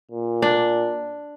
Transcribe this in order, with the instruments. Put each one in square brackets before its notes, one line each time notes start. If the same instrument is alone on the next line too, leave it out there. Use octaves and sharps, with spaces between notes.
[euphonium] A#2
[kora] D4